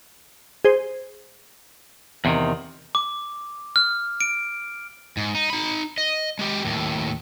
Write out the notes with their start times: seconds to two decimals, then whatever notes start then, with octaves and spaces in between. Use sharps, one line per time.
0.65 G#4 C5
2.25 E2 C3 D#3
2.95 D6
3.76 F6
4.21 D7
5.17 G#2
5.35 D#4
5.50 D#4 B5
5.98 D#5
6.39 G#3 G4
6.64 D#2 A2